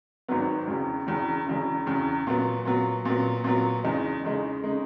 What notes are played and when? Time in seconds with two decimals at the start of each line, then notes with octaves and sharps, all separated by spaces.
0.28 G#1 G#2 D#3 F#3 B3
0.67 E1 E2 C#3
1.07 E1 E2 C#3
1.46 E1 E2 C#3
1.86 E1 E2 C#3
2.27 A#2 F#3 B3
2.65 A#2 F#3 B3
3.05 A#2 F#3 B3
3.44 A#2 F#3 B3
3.84 E2 C#3 G#3 D#4
4.24 E2 C#3 G#3 D#4
4.63 C#3 G#3 D#4